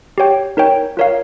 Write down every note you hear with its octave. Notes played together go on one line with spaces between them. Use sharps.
G4 C#5 G5
D#4 A#4 C#5 G5
F4 A#4 C#5 F5